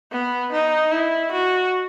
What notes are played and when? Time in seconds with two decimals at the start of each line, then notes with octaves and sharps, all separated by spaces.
0.12 B3
0.52 D#4
0.91 E4
1.32 F#4